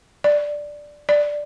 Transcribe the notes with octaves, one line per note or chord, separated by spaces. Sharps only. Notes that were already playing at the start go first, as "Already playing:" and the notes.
D5
D5